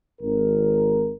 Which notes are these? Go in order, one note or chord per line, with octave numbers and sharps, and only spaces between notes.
G#1 A#4